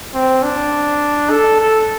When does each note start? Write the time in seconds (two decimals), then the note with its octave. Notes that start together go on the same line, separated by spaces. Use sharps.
0.14 C4
0.43 D4
1.30 A4
1.60 A4